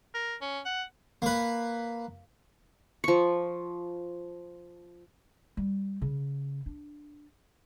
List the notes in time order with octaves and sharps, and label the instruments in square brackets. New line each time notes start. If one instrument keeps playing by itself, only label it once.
[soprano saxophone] A#4
C#4
F#5
[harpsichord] A#3 B4
[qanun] F3 C#6
[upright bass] G3
C#3
D4